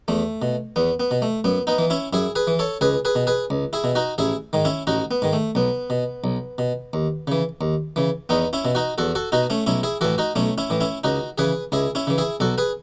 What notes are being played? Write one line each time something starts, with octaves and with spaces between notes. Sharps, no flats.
E2 A3
B2
E2 B3
B3
B2
A3
F#2 B3
B3 D#4
E3
C#4 E4
F#2 E4 G#4
G#4 B4
E3
A4 C#5
C#2 G#4 B4
G#4 B4
B2
G#4 B4
C#2
E4 G#4
B2
D#4 F#4
A1 E4 G#4
G#2 D#3
C#4 E4
A1 D#4 F#4
B3
G#2 D#3
A3
B1 B3
B2
B1
B2
D#2
C#3 E3
D#2
C#3 E3
E2 B3 D#4
C#4 E4
B2
D#4 F#4
E2 F#4 A4
F#4 A4
B2 D#4 F#4
A3 C#4
B1 C#4 E4
E4 G#4
A2 E3 F#4 A4
D#4 F#4
B1 A3 C#4
C#4 E4
A2 E3
C#4 E4
C#2 D#4 F#4
C#3 E3 G#4 B4
C#2 E4 G#4
C#4 E4
C#3 E3
E4 G#4
B1 F#4 A4
G#4 B4